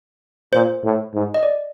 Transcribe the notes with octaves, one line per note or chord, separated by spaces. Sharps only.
A#2 C5
A2
G#2
D#5
D5